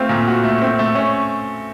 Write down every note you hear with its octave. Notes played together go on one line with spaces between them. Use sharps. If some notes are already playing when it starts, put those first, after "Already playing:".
Already playing: A3 C4 F4
A#2
F#4
A3
C4
A3
C#4